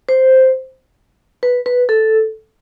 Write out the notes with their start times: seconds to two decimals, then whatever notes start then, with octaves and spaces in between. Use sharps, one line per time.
0.09 C5
1.43 B4
1.66 B4
1.89 A4